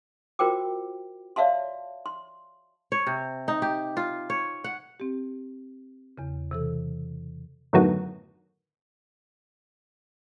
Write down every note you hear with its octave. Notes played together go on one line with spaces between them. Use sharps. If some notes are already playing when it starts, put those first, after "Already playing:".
F4 F#4 A#4 C5 G5 D6
C#5 D5 E5 F5 A5 C6
C6
C#5
C3
D#4
G4
F4
C#5
F#5
C4 G4
E2 C#3
C3 E3 A4
F#2 A2 D3 D#3 F#3 B3